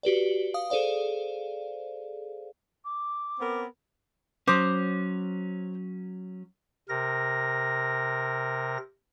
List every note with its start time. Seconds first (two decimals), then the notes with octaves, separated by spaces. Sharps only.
0.03 F#4 G4 B4 D5
0.54 F5 D#6
0.70 G#4 A4 C5 D5 F5
2.85 D6
3.40 B3 C4 A#4
4.47 F#3 C#4 C5 D6 D#6
6.89 C3 A#4 A#6